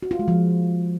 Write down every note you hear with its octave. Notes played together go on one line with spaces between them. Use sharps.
F#4
F4
G#3
F3